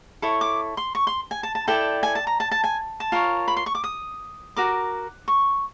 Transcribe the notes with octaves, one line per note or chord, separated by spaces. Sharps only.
E4 A4 C#5 C#6
D6
C6
C#6
C6
G#5
A5
A5
E4 A4 D5 G5
G#5
A5
A#5
A5
A5
G#5
A5
F4 A#4 C#5
B5
C6
C#6
D6
D#6
F#4 A#4 D6
C#6